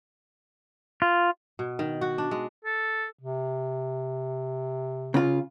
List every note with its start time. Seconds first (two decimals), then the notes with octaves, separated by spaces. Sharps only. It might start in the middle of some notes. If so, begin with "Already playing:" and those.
1.02 F4
1.59 B2
1.79 D#3
2.01 F#4
2.18 D4
2.31 G#3
2.64 A4
3.20 C3
5.14 C#3 F4